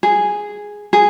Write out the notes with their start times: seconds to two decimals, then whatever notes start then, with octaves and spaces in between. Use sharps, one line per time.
0.03 G#4
0.93 G#4